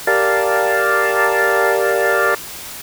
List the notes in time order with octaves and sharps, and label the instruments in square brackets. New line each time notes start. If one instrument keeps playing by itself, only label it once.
[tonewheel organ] G4 A#4 D5 F5 A5